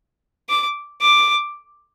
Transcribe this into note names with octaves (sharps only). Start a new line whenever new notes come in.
D6
D6